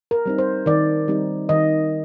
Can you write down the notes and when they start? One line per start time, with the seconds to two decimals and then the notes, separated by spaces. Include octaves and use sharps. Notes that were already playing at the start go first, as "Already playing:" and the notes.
0.11 A#4
0.26 G3 C4 D#4
0.38 C5
0.66 D#3 D5
1.08 G3 C4 D#4
1.49 D#3 D#5